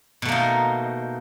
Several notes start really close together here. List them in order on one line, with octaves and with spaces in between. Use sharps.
B2 A3 A#3 D#4